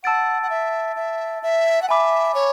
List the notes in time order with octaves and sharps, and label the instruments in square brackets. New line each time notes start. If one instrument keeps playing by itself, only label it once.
[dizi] F#5 [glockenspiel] A5 E6 A6 D7
[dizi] F#5
E5
E5
E5
F#5
[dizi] E5 [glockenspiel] G#5 B5 D6
[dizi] C#5